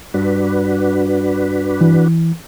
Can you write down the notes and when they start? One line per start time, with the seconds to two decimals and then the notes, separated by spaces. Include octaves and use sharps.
0.14 G2 D4 F#4 B4
1.81 E3